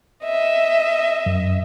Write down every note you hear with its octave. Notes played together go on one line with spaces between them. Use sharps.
D#5 E5
F#2